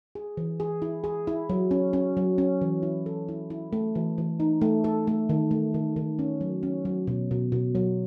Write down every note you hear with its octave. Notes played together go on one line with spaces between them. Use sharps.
G#4
E3
G#4
E4
G#4
E4
F#3
C#4
C#4
F#3
C#4
E3
E4
A4
E4
E4
A3
E3
E3
D#4
A3
A4
A3
D#3
A3
D#3
D#3
C#4
F#3
C#4
F#3
B2
B2
B2
F#3